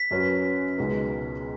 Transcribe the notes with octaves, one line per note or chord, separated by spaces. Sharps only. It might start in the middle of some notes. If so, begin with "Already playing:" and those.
Already playing: B6
F#2 F#3 C#4 F#4 B4
C#2 B2 G#3 D#4 B4